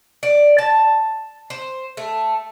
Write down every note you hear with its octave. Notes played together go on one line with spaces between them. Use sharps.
D5
A5
C5
A3